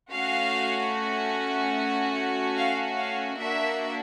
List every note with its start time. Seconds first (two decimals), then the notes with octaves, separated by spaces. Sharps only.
0.11 A3 C#4 F#4 F5
2.57 F5
2.97 F5
3.39 A#3 D4 F#4 E5